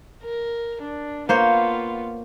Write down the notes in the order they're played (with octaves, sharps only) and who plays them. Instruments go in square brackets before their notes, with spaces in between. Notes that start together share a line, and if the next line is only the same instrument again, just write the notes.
[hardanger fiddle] A#4
D4
[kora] A#3 C5 C#5 [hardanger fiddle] B3 F4